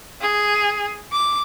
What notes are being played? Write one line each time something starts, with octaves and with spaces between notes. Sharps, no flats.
G#4
D6